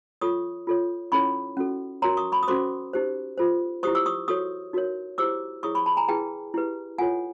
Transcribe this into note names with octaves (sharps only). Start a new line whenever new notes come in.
F4 A4 C#5 C#6 D#6
F4 A4 C#5
C#4 E4 A4 C#5 B5 C#6
C#4 F#4 A4
F#4 A#4 C#5 A#5 C6
C#6 D#6
B5 C#6
D#6
C#4 F#4 A4 C5 C6 D6
D#4 G4 C5
F4 A4 C5
E4 G4 C5 C#6 D#6
D6 E6
C#6 D#6
F#4 A4 C#5 C#6 D#6
D#4 F#4 A#4 C#5
E4 G4 C5 D6 E6
E4 G#4 C#5 C#6 D#6
B5 C#6
A5 B5
G#5 A#5
E4 G#4 B4 G5 A5
E4 G4 B4
F4 A4 C#5 F#5 G#5